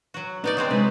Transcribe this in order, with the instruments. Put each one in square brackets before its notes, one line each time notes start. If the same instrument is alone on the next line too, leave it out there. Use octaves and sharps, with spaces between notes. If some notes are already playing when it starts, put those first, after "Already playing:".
[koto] F#3 F#4
[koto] B3 D#4 D5 [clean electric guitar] D4
[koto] F#3 G#3 C4
[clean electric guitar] C3 G#3 [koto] B4